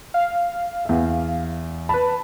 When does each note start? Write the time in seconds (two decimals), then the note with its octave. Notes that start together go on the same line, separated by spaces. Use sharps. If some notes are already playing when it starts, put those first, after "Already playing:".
0.14 F5
0.85 E2 E5
1.89 B4 A5 B5